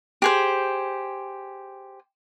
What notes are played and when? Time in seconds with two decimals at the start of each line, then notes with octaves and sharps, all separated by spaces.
0.22 G4 G#4 C5